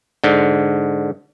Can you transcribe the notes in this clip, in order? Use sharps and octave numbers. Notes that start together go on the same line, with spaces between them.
G#2 D3